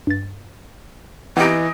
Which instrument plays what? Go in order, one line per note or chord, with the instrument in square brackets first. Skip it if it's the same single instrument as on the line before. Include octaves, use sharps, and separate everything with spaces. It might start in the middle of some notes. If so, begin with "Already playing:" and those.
[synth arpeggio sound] G2 A6
[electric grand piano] E3 D7 [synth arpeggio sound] B3 C4 G4 [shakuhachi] D#5